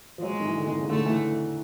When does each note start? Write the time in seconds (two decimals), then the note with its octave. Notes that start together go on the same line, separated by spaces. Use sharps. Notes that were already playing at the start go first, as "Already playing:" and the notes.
0.18 F3
0.23 F#3 G#3
0.40 D#3
0.45 E3
0.58 D3
0.68 D#3
0.81 C#3
0.89 D3 A3
1.06 E3